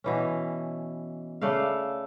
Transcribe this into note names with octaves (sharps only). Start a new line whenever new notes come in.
B2 E3 C#4
C#3 A3 D5 F5